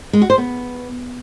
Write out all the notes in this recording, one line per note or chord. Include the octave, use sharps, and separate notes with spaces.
G#3
F#4
C5
B3